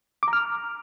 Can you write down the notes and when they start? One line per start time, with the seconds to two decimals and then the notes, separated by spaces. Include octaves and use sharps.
0.23 D6
0.28 A#5
0.33 F6